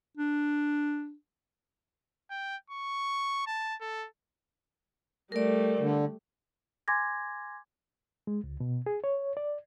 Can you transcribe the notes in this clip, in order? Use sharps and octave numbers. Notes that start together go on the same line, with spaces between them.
D4
G5
C#6
A5
A4
G3 A3 A#4 D5
D3
G#5 C6 D6 G#6 A#6
G#3
C#2
B2
G#4
C#5
D5